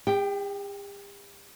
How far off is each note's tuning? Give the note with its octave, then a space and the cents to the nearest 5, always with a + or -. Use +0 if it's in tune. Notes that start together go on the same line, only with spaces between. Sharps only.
G4 +45 G5 +0